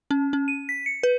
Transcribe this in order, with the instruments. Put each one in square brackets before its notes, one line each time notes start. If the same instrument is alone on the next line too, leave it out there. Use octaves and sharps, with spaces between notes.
[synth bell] C#4
C#4
D#7
B6
C#7
B4